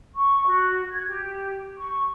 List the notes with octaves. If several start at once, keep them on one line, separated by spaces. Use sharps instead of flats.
C#6
F#4
G#6
G4
C#6